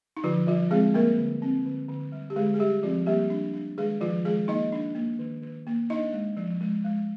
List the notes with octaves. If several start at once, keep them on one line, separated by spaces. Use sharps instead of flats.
D#4
D3 F3 F4
F3 G3 F4
G#3 C4 G#4
G3 A#3 A#4
D3
C4
D3
D3
G3
G4
D3 G#3 G#4
G#4
G3 G4
F3 C4 F4
G3 A#3 G4
D4
D4
D#3 G#3 G#4
D#3 F3 F4
D#3 G#3 G#4
A#3 D#4 D#5
D4
A#3
D#3
D#3
A#3
D4 D#4 D#5
G#3
F3
G#3
G#3